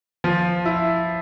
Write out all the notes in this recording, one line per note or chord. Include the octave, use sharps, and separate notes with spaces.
F3
E4